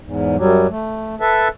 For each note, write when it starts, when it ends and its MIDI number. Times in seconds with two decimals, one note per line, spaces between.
0.01 0.36 40
0.01 0.36 44
0.37 0.67 42
0.37 0.67 54
0.37 0.67 55
0.70 1.15 57
1.20 1.48 69
1.20 1.48 71
1.20 1.48 76
1.20 1.48 81